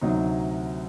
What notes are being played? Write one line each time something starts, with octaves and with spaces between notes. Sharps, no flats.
D2 C3 F#3 D#4